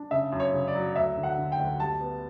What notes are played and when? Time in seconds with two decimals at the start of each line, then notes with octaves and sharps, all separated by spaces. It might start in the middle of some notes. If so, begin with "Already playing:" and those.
Already playing: D4
0.11 C#3 E5
0.32 F#2
0.40 C#5
0.53 C#3
0.68 D5
0.75 F#3
0.96 D2 E5
1.17 D3
1.23 F#5
1.38 D3
1.52 G5
1.59 D2
1.80 G3 A5
2.01 B3